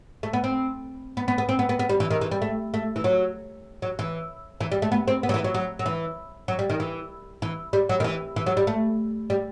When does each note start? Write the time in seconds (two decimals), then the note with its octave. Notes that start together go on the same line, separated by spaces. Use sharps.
0.23 A3
0.33 B3
0.44 C4
1.17 B3
1.28 B3
1.38 B3
1.49 C4
1.59 B3
1.69 B3
1.79 B3
1.89 G3
2.00 E3
2.10 D#3
2.21 E3
2.31 G3
2.42 A3
2.74 A3
2.96 E3
3.04 F#3
3.82 F#3
3.99 E3
4.61 E3
4.72 G3
4.82 A3
4.92 B3
5.08 C4
5.23 B3
5.29 F#3
5.34 E3
5.44 F#3
5.54 F#3
5.79 F#3
5.86 E3
6.48 F#3
6.59 G3
6.70 D#3
6.80 E3
7.42 E3
7.73 G3
7.89 F#3
8.00 D#3
8.04 E3
8.36 E3
8.46 F#3
8.57 G3
8.67 A3
9.30 G3